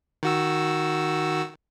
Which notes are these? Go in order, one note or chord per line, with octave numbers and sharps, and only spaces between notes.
D#3 F#4 E6